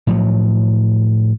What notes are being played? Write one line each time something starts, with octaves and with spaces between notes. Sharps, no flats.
A2 F3 F#3